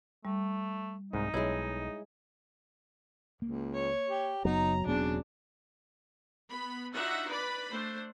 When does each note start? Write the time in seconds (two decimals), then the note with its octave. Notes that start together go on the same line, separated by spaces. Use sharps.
0.25 G3 A3
1.13 C2 G#2 D#4
1.34 B1 G#3 E4 C#5
3.42 C#2 A#3
3.74 C#5
4.09 G4
4.45 F#1 F#3 B3 D#4 A#5
4.87 E1 C#3 B3 C4 D4
6.48 B3 B5
6.93 D4 D#4 F4 F#4 E5 F#5
7.27 B4 D5 B5
7.69 A3 D4 C5